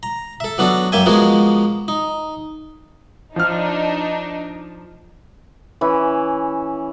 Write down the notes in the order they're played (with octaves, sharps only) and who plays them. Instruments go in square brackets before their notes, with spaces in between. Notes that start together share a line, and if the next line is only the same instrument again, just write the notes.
[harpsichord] A#5
A4 E5
F#3 B3 D4 F#4 A4
F#2 A#3 E5 G5 G#5
F3 G#3 A#3 B3 F4 F#4
D#4
[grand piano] F3 F6 [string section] D4 D#4
[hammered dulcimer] E3 C#4